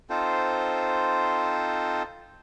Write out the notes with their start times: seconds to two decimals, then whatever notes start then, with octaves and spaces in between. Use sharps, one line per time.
0.10 C4 D#4 F4 A4 C5